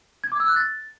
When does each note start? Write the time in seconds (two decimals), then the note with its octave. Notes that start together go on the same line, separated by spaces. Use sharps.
0.24 G#6
0.32 D6
0.40 E6
0.48 F#6
0.56 A6